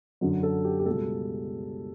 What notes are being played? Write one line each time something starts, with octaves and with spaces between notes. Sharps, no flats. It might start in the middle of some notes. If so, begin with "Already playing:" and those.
F#2 D3 F#3
A4
G4
G4
C#2 B2 G3 A4